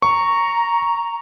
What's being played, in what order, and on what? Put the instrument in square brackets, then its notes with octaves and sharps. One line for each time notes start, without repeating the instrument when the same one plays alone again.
[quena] A#5 [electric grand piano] C#6